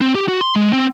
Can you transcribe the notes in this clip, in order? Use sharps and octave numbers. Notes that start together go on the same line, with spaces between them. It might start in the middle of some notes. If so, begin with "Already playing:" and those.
C4
G4
F#4
C6
G#3
C4